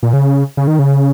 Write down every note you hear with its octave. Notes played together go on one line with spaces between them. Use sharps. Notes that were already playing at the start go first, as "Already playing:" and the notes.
A#2
C#3
C#3
D#3
C#3